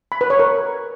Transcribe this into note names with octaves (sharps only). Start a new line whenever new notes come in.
B5
B4
C#5
A#4